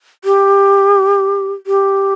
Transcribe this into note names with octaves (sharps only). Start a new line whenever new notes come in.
G4
G4